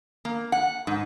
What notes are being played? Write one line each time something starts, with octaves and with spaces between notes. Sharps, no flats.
A#3
F#5
G#2